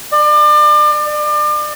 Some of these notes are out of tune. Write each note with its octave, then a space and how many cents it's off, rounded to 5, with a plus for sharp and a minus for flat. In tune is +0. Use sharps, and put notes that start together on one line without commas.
D5 +35
D5 +35